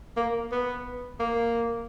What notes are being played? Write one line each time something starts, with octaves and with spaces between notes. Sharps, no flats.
A#3
B3
A#3